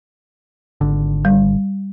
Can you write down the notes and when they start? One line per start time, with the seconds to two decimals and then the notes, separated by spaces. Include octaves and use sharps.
0.81 G#1 D3
1.25 G3